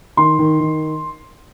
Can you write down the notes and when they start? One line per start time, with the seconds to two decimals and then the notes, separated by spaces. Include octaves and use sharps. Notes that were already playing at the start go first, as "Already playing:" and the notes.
0.17 D#3 C6
0.39 D#3
0.60 D#3